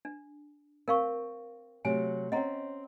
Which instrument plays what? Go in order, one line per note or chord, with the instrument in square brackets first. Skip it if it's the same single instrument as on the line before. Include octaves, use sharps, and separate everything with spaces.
[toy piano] D4
[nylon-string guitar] C4 [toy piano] A#4 F5 C#6
[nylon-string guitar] C3 F#3 A3 [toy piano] G#5
[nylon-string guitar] C4 C#4 G5 [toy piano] D#5 F#5 A#5